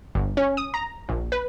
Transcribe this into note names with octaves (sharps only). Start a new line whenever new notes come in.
G1
C#4
D#6
A#5
A#1
B4